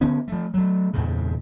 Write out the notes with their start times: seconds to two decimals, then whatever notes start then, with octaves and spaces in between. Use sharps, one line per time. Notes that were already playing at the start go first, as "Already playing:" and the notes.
0.01 D3 B3 C#4
0.28 F3 A3
0.54 F#3 A3
0.93 E2 G2 A#2 C#3